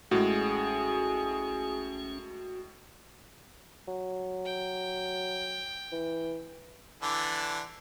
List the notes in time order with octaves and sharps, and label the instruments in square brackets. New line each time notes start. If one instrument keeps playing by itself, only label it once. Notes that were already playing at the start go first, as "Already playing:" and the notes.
[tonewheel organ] A1 C#4 [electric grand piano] A2 G#3 [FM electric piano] F#4 [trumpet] G#4
[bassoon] F#3
[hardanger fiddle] G5
[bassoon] E3
[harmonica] D3 E3 D4